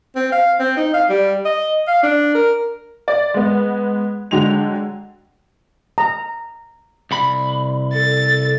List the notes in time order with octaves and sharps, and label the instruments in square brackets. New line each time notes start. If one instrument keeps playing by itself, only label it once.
[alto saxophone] C4
F5
C4
D#4
F5
G3
D#5
F5
D4
A#4
[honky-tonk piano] D5
G#3 B3
D3 F#3 G#3 G5 F7
[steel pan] A#5
[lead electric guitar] C2 B5
[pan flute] A4 [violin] A6